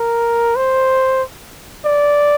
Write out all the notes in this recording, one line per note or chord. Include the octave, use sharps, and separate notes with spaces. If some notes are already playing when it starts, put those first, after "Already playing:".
Already playing: A#4
C5
D5